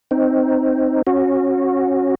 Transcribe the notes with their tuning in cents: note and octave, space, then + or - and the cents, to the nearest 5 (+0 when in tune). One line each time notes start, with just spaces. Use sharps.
C4 +0 D#4 +0
C#4 -25 F#4 -15